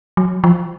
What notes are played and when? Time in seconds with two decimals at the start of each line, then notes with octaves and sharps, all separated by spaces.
0.17 F#3
0.44 F3